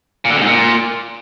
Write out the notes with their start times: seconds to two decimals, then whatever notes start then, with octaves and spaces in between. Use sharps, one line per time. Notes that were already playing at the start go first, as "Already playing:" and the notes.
0.25 A#2
0.30 D3
0.36 F2
0.41 G#2
0.46 A#2